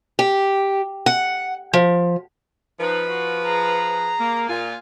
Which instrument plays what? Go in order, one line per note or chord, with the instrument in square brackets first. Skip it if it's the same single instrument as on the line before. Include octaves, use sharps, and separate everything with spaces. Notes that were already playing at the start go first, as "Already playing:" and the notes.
[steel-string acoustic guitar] G4
F#5
F3
[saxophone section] F3 B4 [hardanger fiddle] D#4
[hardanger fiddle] F#4
G#4 A#5
[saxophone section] A#3
[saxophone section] A#2 F4 [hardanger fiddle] G#5